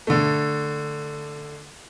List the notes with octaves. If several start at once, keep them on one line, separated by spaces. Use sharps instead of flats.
D3 A3